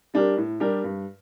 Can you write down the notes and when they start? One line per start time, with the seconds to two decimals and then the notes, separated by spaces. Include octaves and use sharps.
0.14 G3 D4 G4 A#4
0.37 A2
0.60 G3 D4 G4 A#4
0.84 G2